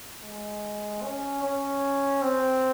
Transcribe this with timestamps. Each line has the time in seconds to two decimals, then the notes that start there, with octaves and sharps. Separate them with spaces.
0.23 G#3
1.03 C#4
1.42 C#4
2.22 C4